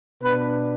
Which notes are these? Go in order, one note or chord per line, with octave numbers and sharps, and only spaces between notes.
B2 B3 D4 B4